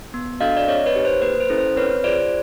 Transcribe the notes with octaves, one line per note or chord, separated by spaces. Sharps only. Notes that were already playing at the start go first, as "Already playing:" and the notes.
B3
D4 F#4 A4 D#5 F5
D5
C4 C#5 D#5
B4 C#5
D#4 G4
C5
A#3 B4
C5
C#4 E4 A4
C5
C4 B4 C#5
F4 G#4 C5 D5